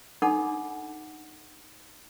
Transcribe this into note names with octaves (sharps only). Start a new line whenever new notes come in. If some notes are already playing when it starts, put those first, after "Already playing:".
D4 D#4 A4 F#5 B5 D6